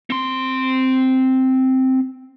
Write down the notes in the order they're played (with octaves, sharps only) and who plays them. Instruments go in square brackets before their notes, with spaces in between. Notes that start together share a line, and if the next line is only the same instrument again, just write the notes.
[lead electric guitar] C4 C6